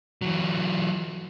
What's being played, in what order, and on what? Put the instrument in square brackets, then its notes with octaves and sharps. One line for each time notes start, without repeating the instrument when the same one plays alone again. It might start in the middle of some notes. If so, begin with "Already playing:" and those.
[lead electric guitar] E3 F#3